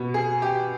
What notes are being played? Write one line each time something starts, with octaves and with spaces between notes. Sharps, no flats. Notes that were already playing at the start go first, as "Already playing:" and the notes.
Already playing: B2 B3
G#4
G4